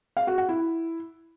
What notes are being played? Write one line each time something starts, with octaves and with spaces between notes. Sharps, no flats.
F5
F#4
F#5
E4